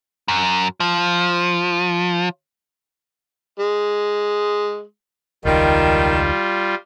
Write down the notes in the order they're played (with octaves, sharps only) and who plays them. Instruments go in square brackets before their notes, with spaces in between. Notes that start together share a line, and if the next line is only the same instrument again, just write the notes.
[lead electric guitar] F#2
F3
[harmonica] G#3
[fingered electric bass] E1 C#2 [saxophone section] D#3 [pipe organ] G3 F4